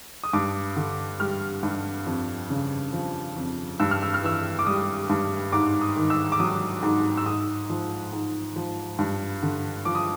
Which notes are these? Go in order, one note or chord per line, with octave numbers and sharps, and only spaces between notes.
D#6
G2 D6
D3
G3 F6
G2
F2
C#3
F3
F2
G2 E6
F6
E6
F6
E3 E6
D6
G3 D#6
G2
G#2 D6
D#6
D#3
E6
D6
F#3 D#6
G#2
E6
G#2 D#6
F3
G#2
F3
G2
D3
F3 D6
D#6